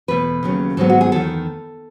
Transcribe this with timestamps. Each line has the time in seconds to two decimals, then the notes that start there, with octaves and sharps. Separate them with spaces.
0.08 E2 B2 A3 B4
0.43 D#2 C#3 F#3 A3
0.77 G#2 D#3 F#3 B3 A4
0.90 F#4
1.01 G#4
1.12 E2 D#3 A3 A4